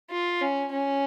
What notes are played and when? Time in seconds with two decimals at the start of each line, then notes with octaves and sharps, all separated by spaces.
0.11 F4
0.41 C#4
0.72 C#4